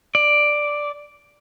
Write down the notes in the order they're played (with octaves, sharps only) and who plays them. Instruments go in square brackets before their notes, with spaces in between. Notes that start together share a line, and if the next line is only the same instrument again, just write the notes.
[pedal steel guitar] D5